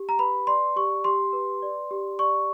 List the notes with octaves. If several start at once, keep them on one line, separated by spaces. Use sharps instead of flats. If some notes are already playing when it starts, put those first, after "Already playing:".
Already playing: G4
A#5
B4 B5
D5 C6
G4 C#6
G4 C6
B4
D5
G4
D5 C#6